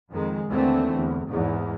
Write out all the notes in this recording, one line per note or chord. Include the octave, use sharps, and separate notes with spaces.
F2 D#3 G#3
D#2 D3 E3 A3 C4
E2
E2 G#2